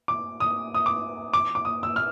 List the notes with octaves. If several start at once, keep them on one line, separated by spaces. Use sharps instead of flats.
D6
D#6
D#6
D6
D6
D6
D#6
E6
F6